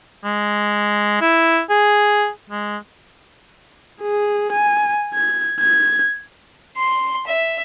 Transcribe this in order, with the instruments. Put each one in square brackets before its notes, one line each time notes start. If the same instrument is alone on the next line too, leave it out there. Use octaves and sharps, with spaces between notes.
[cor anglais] G#3
E4
G#4
G#3
[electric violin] G#4
G#5
G#6
G#6
[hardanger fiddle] C6
E5